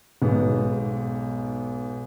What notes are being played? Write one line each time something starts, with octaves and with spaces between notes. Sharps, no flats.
B1 G#2 B3